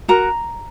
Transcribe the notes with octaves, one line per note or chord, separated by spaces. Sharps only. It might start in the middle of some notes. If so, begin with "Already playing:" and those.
F#4 A#4 A#5